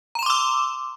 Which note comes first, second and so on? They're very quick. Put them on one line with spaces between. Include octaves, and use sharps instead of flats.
A#5 E7 C6 D6 E6